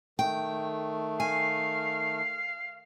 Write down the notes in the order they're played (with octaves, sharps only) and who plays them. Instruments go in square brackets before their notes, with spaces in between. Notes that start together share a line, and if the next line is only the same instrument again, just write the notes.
[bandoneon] D#3 A3 [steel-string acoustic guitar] G5
[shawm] F5 [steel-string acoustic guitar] G#5